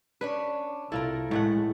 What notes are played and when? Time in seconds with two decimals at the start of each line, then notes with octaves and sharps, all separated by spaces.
0.21 C#4 D4 B4 C#5
0.92 C2 E4 F4 A4 A#4
1.31 A1 A2 G#3 A3 F#5